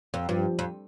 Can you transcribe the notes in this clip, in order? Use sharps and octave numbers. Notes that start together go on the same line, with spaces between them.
F2
G2 F3
F2